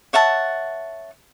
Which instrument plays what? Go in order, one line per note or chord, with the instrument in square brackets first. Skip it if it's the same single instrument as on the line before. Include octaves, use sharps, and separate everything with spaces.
[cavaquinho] C#5 E5 F#5 A5